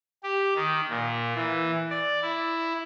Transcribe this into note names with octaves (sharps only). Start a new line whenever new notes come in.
G4
D#3
A#2
E3
D5
E4